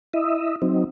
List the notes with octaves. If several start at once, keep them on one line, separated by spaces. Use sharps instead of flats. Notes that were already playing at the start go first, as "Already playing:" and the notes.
E4 D#5 E5
F#3 C4 D#4